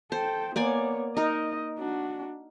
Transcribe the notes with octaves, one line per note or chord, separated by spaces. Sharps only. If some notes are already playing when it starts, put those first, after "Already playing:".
A4 C5 G5
A#3 B3 C#5 D5 G#5
D#4 A#4 D#5
D4 F#4